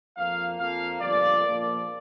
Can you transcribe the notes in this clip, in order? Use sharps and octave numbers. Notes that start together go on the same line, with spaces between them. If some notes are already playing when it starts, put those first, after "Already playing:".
F2 F3 A#3 F5
F2 F3 A#3 F5
G1 F2 F3 A#3 D5
A#1 A#2 F3 A#3